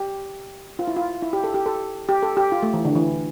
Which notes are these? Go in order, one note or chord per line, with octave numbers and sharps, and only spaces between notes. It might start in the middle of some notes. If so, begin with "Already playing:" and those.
Already playing: G4
F4
E4
F4
E4
G4
A4
G4
A4
G4
A4
G4
F4
A3
E3
D3
E3